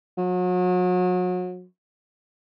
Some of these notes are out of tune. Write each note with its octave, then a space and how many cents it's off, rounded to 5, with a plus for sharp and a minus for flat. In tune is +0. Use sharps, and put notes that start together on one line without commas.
F#3 -35